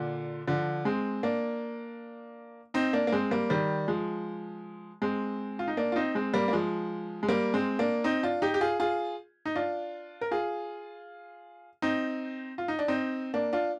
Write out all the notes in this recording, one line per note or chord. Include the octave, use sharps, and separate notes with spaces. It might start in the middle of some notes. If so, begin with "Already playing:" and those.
Already playing: A#2 D3
D3 F3
G#3 C4
A#3 D4
C4 D#4
A#3 D4
A#3
G#3 C4
G3 A#3
D#3 G3
F3 G#3
G#3 C4
F4
D#4
A#3 D4
F4
C4 D#4
G#3 C4
G3 A#3
A#3
F3 G#3
G#3
G3 A#3
G#3 C4
A#3 D4
C4 D#4
D4 F4
D#4 G4
G4
F4 G#4
F4 G#4
D#4
D4 F4
A#4
F4 G#4
C4 D#4
F4
D#4
D4
C4 D#4
A#3 D4
D4 F4